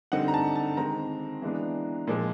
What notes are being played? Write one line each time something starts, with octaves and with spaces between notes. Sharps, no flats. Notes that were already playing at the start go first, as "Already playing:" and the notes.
D3 G3 C4 D#4 F#5
A#5
A5
A5
D#3 G#3 C4 A#5
E3 G#3 B3 D4
A#2 F3 G#3